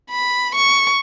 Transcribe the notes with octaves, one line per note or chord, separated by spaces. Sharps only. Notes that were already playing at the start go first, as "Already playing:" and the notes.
B5
C#6